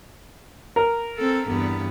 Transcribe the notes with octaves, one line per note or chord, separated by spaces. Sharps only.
A#4
C4 A4
E2 G2 B3